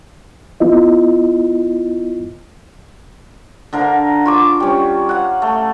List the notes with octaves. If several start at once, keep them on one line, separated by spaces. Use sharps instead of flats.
B3 E4 F4 D#5
D3 A#4 F5
F4 C#6 D6
G3 C#4
F5 F#5
A3